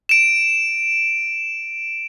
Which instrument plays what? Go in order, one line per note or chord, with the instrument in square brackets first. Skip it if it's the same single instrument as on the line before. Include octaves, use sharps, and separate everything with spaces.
[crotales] D7 E7